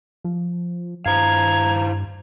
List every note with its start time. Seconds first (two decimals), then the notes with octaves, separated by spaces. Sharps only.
0.24 F3
1.06 G2 E4 C5 F5 A#5 G#6